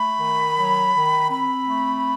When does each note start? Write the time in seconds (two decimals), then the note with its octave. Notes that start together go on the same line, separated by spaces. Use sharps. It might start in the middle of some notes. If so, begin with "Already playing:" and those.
Already playing: A3 B5
0.19 D#3
0.57 F#3
0.94 D#3
1.30 C4 B5
1.68 A3